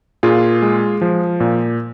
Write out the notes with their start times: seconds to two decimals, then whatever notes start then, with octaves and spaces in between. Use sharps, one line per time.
0.23 A#2 F4 G#4
0.62 G#3
1.02 F3
1.40 A#2